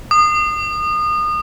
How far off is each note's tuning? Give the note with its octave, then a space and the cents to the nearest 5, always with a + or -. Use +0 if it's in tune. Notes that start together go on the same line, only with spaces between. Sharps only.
D#6 -30